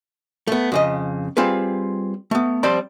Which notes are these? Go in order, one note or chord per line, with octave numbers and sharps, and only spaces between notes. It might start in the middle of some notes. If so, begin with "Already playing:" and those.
A3 B3
F2 C#3 D#5
G3 C4 F4 G#4 B4
A3 B3
F3 G3 C4 C5 D5 B5